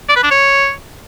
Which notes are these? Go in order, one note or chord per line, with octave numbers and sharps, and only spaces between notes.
D5
B4
D4
C#5